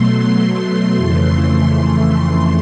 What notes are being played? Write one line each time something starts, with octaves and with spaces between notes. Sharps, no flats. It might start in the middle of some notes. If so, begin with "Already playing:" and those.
Already playing: B2 F#3 A3 C6
F2 C#3 E3 A3 C6
C6